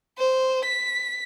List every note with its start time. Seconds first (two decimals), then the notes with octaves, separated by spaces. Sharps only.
0.19 C5
0.65 B6